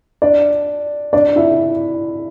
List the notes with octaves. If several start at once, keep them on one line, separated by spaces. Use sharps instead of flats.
D4 D5
D4 D5
E4 E5